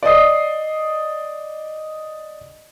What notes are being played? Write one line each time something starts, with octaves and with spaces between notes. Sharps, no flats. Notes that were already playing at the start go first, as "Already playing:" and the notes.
D5 D#5 D#6 C7